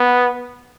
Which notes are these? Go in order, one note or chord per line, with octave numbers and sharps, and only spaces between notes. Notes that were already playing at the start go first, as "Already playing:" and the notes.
Already playing: B3